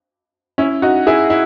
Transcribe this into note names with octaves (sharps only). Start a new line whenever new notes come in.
C#4 E4
D#4 F#4
E4 G#4
E4